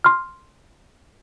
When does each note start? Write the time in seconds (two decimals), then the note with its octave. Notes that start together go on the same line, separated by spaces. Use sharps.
0.04 C6 F6